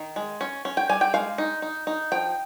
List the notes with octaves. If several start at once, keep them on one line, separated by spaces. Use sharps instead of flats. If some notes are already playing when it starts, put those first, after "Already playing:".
Already playing: D#3
G#3
C#4
C#4
G5
G3 G#5
G5
G#3 F5
D#4
D#4
D#4
F3 G5